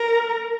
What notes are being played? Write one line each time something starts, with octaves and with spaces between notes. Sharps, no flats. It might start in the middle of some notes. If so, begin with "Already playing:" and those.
Already playing: A#4